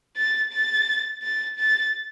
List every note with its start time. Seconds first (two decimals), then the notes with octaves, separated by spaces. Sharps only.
0.17 A6
0.53 A6
1.23 A6
1.59 A6